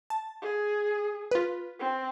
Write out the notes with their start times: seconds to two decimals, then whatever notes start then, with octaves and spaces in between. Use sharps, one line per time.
0.10 A5
0.42 G#4
1.31 F4 B4
1.80 C4